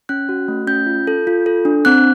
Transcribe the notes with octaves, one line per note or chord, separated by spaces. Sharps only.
C#4 F#6
F#4
A3
C#4 G6
F4
A4
F4
A4
D4
C4 F#6